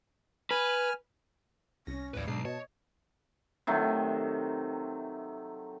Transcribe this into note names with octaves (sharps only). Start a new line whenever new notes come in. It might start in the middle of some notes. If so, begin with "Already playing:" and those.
B4 G#5 F6
C2 C#4 A#6
A#1 D#2 A2 B4 D5
B1 G#2 D4 C7
B2 C#5 D#5 A5
C3 D#3 F#3 A3